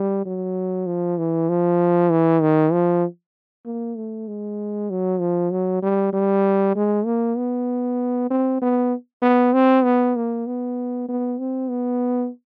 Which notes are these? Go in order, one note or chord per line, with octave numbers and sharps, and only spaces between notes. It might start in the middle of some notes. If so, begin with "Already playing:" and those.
Already playing: G3
F#3
F3
E3
F3
E3
D#3
F3
A#3
A3
G#3
F#3
F3
F#3
G3
G3
G#3
A#3
B3
C4
B3
B3
C4
B3
A#3
B3
B3
C4
B3